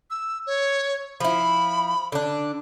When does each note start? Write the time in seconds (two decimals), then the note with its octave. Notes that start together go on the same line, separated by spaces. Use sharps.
0.11 E6
0.47 C#5
1.20 F3 E4 B5
2.12 D3 D4